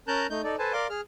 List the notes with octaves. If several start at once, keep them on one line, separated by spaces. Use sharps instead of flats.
C#4 A#4 A5 A#5 F#6 G6
A3 D#4 G6
D#4 A4 D5
A4 B4 C5 G#5 A5
A#4 D5 F5 C6 D6
G#4 F6